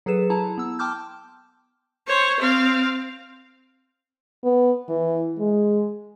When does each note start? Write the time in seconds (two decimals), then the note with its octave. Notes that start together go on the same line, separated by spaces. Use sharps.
0.06 F#3 G#4 A4 B4 E7
0.30 E4 A5 A#5
0.58 B3 E6
0.79 G5 A5 C6 D6 F6 G6
2.07 C5 C#5
2.40 C4 F5
4.44 B3
4.89 E3
5.39 G#3